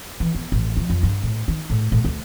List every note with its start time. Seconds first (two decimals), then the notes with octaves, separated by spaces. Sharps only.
0.20 E3
0.35 B3
0.52 A1
0.77 F3
0.90 F2
1.03 G2
1.23 A2
1.48 D#3
1.70 A2
1.92 A2
2.05 D2